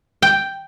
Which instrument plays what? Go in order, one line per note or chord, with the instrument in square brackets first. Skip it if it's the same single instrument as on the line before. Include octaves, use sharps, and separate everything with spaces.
[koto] G5